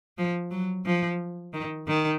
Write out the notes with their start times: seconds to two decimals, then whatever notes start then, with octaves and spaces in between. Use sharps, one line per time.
0.18 F3
0.51 F#3
0.86 F3
1.53 D#3
1.88 D#3